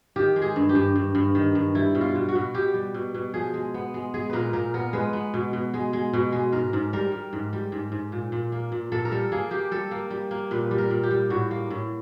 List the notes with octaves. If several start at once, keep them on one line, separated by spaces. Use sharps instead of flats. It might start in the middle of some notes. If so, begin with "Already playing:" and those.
D#3 G4
G#3
G#4
G2
G4
G2
G2
G2
D#3
G2
G3 E4
B2
F4
B2
F#4
B2
B2 G4
G3
B2
B2
F3 G#4
G#3
B3
G#3
G#3 G#4
A#2 A#4 B4
A#2 A#4
B3 A#4
G#3 B4
B3
B2
B2
G#3
G#3
B2
G#3
G#2 A#4
G#2
G3 A#4
G3
G#2
G3
G#2
G#2
A#2
A#2
A#3
A#2
A#2 A4
A#4
G3 A4
A#3 G#4
A#3 G4
G3 A4
A#3
G3
A#3
A#2 B4
G3
A#4
A#2
G4
G3
A2 F#4
A#3
A2